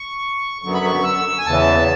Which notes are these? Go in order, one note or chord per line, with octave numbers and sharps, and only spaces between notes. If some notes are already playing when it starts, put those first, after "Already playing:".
Already playing: C#6
F#2 D3 F#3 B3 C#6
B5
C#6
E6
G#5
E2 C#3 E3 A5